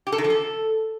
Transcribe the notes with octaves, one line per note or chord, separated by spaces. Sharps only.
G4
A4
D#3
F3
A4